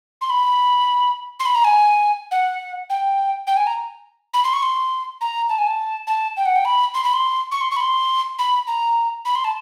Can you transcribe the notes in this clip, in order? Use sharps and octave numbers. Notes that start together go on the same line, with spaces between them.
C6
B5
C6
B5
A#5
G#5
F#5
G5
G5
G#5
A#5
B5
C6
C#6
C6
A#5
A5
G#5
A5
A5
G5
F#5
G5
B5
C6
B5
C6
C#6
C6
C#6
B5
C6
B5
A#5
B5
C6
A5